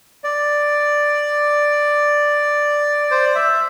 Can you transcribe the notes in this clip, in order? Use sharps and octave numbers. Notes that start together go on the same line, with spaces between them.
D5
C5
E5